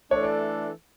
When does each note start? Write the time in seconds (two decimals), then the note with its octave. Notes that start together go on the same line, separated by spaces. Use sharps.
0.11 E3 A3 D4 A4 C#5
0.24 D5